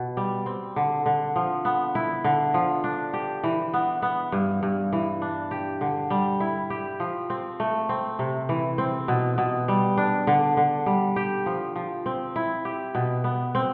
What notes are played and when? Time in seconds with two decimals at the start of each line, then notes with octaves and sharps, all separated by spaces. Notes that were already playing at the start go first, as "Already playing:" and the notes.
Already playing: B2
0.17 G3
0.46 C4
0.76 D3
1.06 D3
1.36 F3
1.65 B3
1.95 E4
2.24 D3
2.54 F3
2.84 D4
3.14 G4
3.44 E3
3.74 B3
4.02 B3
4.32 G2
4.63 G2
4.93 E3
5.22 D4
5.51 G4
5.81 D3
6.10 G3
6.40 E4
6.70 G4
7.00 F3
7.30 C4
7.60 A3
7.89 C4
8.19 C3
8.49 E3
8.78 C4
9.08 B2
9.38 B2
9.68 G3
9.98 D4
10.27 D3
10.57 D3
10.86 G3
11.16 G4
11.46 F3
11.76 F3
12.06 C4
12.36 E4
12.65 G4
12.95 B2
13.24 B3
13.55 C4